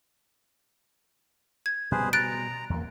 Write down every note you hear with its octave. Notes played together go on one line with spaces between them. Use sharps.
G#6
B2 G3 G#4 B4 C5
A#5 F#6 A6 D7
E2 A#3